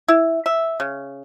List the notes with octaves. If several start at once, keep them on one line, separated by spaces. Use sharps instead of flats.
E4
E5
C#3